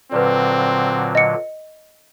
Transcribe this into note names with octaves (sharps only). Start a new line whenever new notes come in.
A#2 D3 F#3 C4 B4 D5
D#5 C#7